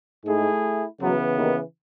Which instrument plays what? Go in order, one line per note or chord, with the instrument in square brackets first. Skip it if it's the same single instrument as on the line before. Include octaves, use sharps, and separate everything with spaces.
[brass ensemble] G#2 G#3 [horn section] A3 E4 G#4
[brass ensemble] F#2 F#3 [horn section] C#3 E3 B3
[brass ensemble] D#2 D#3